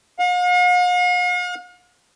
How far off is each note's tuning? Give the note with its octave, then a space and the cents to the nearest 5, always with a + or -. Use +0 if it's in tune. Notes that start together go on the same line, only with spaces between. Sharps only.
F5 +45